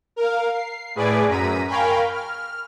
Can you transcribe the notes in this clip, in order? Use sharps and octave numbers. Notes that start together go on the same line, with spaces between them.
A#4 F5
C7
A2 G#4 B4 D5 D6 G#6
F#2 A#5 B6 D#7
A#4 F5 G5 G#5 B5 C#6
F6